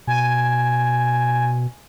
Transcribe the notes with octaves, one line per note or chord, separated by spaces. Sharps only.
B2 G#5